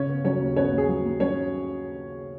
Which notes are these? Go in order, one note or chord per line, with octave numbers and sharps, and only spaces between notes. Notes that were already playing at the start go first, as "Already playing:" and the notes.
Already playing: C#3 C#4 C#5
B3
F#3 C#4 C#5
D#2
B3 C#4 C#5
D#2
G#4
F#3
D#2
F#3 C#4 C#5